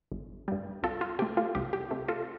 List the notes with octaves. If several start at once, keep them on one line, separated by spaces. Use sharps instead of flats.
G1
G2 G3
C2 F4 A4
F4
C3 A3 G4
F4 A4
C2 G4
G4
C3 A3
F4 A4